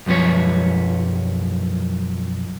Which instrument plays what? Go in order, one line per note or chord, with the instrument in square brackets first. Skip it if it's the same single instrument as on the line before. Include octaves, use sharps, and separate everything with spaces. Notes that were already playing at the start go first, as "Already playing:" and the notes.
[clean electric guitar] B1 F#2 F3 B4 C#5